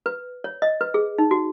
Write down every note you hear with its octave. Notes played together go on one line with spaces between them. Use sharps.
B4
C#5
D#5
B4
G#4
D#4
F#4